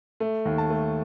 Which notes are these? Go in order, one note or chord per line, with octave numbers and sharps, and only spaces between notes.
A3
D#2
A5
A3